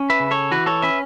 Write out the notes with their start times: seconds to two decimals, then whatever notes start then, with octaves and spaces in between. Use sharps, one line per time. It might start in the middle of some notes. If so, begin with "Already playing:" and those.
Already playing: C#4
0.10 B4 E5
0.20 C#3
0.31 A4 C#5
0.51 E3 F#4 B4
0.66 A4 C#5
0.82 C#4 B4 E5